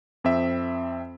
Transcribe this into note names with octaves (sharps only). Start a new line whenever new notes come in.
F2 C4 E5